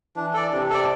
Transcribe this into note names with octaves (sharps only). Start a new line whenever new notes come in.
E3 D4
A4 D5
C3 D4
A4 D5